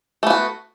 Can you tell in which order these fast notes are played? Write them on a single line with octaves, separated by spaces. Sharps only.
A3 B3 F#4